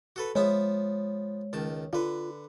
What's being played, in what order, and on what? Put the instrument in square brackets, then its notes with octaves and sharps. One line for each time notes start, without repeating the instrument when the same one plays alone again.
[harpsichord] F#4 A4 B4
[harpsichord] F3 B3 E5 [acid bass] G#3 [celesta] C#5
[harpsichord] C#2 D#3 A5
[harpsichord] D3 B4 [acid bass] F4